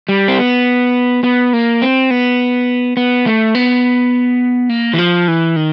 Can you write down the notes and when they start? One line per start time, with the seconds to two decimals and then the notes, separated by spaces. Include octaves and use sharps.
0.09 G3
0.28 C4
0.38 B3
1.24 B3
1.53 A#3
1.82 C4
2.11 B3
2.97 B3
3.26 A3
3.55 B3
4.69 A#3
4.94 E3
4.98 F3
5.28 E3
5.56 D#3